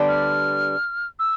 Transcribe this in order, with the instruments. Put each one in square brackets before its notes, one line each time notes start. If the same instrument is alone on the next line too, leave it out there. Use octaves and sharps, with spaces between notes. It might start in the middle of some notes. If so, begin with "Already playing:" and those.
Already playing: [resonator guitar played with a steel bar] D3 G3 B3 D4 G4
[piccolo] F6
E6